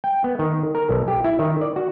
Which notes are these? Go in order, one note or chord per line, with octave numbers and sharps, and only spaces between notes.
G5
B3
D#3
A#4
B1
G4
E4
D#3
D5
F#4